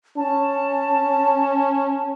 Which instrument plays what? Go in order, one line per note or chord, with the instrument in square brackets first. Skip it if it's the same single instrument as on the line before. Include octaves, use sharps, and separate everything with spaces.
[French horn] C#4 [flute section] A5